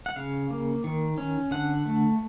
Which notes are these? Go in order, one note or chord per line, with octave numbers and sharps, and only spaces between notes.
F#5
C#3 F5
A#3
D#3
C#4
D3 F#5
A3